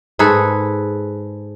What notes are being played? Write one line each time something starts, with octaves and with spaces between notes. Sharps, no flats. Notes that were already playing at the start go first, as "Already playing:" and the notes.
G#2 G#4 A4 B4